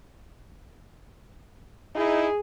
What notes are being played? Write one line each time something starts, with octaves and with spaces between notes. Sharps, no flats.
D#4 E4 G#4